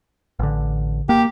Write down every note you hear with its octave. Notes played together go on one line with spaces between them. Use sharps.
A1 D3
A#3 G4